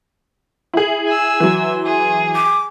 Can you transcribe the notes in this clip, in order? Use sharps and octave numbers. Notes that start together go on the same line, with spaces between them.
E4 G#4
G#5 E6
E3 F#3 C6
G#4
D6